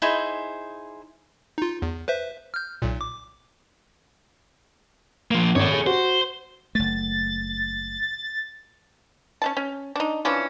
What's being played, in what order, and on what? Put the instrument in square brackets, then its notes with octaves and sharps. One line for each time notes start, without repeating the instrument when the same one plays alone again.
[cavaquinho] D#4 E4 G#4 C5
[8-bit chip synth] D#4 F4
E2
B4 C5 E5
F6 G6
B1 A#2
D6
[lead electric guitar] F3 A#3
[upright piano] G#1 [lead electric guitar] A4 C#5
[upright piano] G#4
[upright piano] F#4 [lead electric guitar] C5
[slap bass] F#1 A3 [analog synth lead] A6
[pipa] C#4 D4 A5
C#4
D4 D#4
E3 F3 C#4 D4